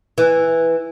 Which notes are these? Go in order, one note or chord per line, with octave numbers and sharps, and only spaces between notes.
E3